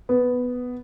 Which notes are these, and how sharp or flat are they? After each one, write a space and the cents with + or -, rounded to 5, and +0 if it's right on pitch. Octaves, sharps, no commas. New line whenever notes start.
B3 +5